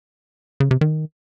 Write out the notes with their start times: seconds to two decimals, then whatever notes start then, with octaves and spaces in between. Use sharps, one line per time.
0.60 C#3
0.71 C3
0.81 D#3